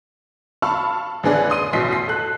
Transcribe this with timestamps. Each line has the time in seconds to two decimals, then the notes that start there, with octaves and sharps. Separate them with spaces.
0.62 F5 A5 B5 C#6 E6
1.23 A1 D3 B3 G#4 B4 D5
1.50 C6 D#6 D#7
1.73 A1 B2 D#5 C6 B6 C7
1.91 B6 C7
2.08 A4 F#6